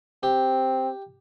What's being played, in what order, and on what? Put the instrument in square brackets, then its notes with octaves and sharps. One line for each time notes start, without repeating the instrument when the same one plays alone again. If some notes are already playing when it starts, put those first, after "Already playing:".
[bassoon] C4 [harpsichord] G4